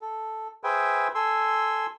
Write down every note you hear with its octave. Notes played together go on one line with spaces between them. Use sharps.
A4
G#4 B4 C5 E5 G5 G#5
A4 G#5 C6 E6